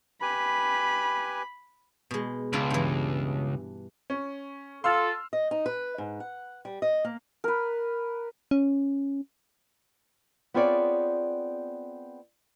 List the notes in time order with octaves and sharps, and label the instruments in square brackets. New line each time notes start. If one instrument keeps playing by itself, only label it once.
[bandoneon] G4 B4 G#5 [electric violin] B5
[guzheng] B2 G#3
[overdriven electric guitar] C#2 [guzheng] D4 E4 F4
[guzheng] G2 E3
[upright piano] C#4
[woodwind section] F4 A4 [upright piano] C6 E6 F6
[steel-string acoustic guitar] D#5
D#4
B4
G#2
F#5
G3
D#5
A#3
[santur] A#4 B4
[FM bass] C#4
[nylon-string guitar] B3 C4 F4 G#4 C#5 D5